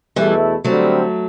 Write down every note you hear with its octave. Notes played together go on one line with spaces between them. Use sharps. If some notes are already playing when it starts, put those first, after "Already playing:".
E2 B2 E3 G3 A3 E4 A4
D3 F#3 G3 A3 C4